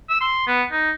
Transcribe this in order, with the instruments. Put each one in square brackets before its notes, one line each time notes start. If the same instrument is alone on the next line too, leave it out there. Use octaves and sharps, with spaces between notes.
[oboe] E6
C6
B3
D#4